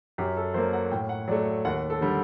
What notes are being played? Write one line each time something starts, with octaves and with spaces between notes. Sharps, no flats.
F#2 G4
A4
F#3 A#3 C5
F#5
A2 G5
F#5
F#3 A3 D5
D#2 F#5
A4
D3 G3